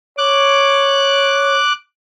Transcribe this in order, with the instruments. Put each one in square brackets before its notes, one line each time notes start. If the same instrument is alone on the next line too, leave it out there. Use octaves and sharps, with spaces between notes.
[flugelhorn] C#5 [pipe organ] D6 F#6